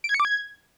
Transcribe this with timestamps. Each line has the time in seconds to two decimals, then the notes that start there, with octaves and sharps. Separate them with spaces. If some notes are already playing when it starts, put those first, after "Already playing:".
0.04 D7
0.09 G#6
0.14 C#7
0.20 D6
0.25 G#6